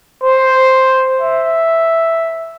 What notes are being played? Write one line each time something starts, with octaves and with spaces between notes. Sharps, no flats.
C5
E5